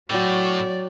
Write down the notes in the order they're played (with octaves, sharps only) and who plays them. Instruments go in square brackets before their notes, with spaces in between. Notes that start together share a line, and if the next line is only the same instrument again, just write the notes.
[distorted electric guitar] A2 [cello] F#3 [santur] F#4 C#5 G5 [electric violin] D5